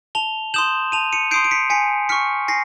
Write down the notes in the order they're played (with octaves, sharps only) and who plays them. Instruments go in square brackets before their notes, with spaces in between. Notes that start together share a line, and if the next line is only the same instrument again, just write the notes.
[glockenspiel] A5 F7 G7
C6 D#6 G6 E7 F#7
A5 D#7 F7
C#7 D#7
C6 D#6 G6 C7 D7
D7
B6 C#7
G#5 B6 C#7
C#6 F6 B6 C#7
G#5 A#6 C7